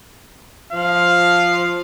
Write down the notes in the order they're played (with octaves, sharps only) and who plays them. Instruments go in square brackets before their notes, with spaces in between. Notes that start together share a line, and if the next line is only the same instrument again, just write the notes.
[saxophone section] F3 [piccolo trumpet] F5